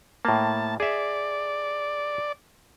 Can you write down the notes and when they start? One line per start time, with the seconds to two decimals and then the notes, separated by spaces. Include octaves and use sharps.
0.25 A2 A#3 A5
0.80 G#4 D5 E5